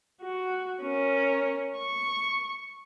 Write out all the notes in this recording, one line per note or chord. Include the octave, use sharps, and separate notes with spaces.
F#4
C#4 A#4
C#6